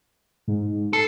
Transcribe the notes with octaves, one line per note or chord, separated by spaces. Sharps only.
G#2
A4 C7